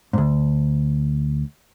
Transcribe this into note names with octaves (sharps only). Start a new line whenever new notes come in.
D2 G#2